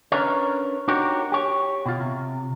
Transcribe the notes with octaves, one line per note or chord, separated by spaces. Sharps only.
C#4 D4 A#4 B4 C#5
D4 D#4 F#4 G4 A#4 C#5
G4 C#5
B2 F4
C3